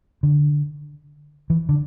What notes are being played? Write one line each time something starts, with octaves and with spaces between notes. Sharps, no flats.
D3
E3
D3